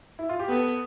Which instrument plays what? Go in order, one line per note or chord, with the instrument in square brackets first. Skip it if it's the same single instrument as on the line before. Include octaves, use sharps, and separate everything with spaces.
[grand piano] E4
F4
G4
[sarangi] B3 [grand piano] A4